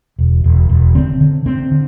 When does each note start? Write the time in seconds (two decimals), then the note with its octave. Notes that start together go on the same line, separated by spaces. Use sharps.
0.19 E1
0.44 E1
0.69 E1
0.95 D3 C4
1.20 D3
1.46 D3 C4
1.71 D3